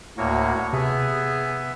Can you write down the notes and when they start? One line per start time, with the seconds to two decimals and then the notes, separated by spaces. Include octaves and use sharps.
0.18 D2 A2 A#3 F#4 C#5
0.73 C3 B3 G#4 E5